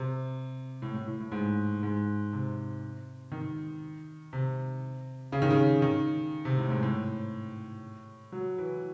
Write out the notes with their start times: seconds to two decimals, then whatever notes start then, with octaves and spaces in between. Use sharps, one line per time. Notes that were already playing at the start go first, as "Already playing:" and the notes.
Already playing: C3
0.82 A2
0.94 A2
1.07 A2
1.20 A2
1.32 G#2
1.83 G#2
2.33 C3
3.32 D#3
4.33 C3
5.32 C#3
5.42 D#3
5.50 C#3
5.82 D#3
6.45 C3
6.57 A2
6.70 G#2
6.83 A2
8.32 F#3
8.58 E3